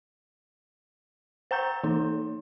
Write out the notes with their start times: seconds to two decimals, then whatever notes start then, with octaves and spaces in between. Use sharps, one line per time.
1.51 C5 G5 A#5 G6
1.84 E3 D#4